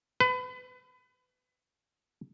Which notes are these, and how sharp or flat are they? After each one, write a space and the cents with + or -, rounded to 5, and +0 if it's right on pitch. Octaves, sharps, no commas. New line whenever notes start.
B4 +30